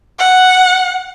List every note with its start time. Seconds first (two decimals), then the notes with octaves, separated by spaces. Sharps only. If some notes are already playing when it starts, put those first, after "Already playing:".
0.19 F#5